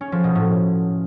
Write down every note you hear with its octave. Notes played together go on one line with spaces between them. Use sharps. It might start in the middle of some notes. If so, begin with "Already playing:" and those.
C#4
F3
B2
A2